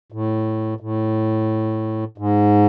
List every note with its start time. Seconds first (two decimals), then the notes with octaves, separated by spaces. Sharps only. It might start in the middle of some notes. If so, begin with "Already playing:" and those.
0.12 A2
0.80 A2
2.18 G#2